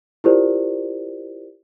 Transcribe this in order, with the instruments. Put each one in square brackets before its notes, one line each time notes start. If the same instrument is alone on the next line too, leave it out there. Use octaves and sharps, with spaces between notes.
[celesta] E4 F4 G4 A#4 C5 D5